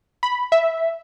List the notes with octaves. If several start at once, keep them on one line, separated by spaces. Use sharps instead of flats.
B5
E5